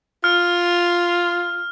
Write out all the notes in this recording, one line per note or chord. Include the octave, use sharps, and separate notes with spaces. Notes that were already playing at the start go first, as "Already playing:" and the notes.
F4 F6